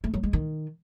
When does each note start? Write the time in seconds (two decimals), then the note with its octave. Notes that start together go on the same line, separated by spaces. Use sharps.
0.04 A3
0.14 F#3
0.23 G#3
0.33 D#3